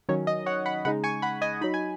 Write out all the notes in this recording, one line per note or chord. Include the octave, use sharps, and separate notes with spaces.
D#3 F#3 C#4 C#5
D#5
C#5 F#5
F#5 B5
C#3 G#3 D#4 F#5 B5
G#5 C#6
F#5 B5
D#5 G#5
F#3 D#4 B5
G#5